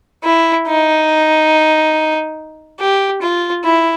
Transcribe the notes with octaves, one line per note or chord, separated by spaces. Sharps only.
E4
D#4
G4
F4
E4